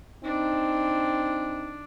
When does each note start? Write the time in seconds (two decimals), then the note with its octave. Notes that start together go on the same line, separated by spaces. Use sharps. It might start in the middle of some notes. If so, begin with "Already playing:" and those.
0.24 C4 D4 D#4